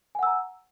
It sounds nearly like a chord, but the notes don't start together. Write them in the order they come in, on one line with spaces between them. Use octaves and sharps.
G#5 F#5 E6 A#5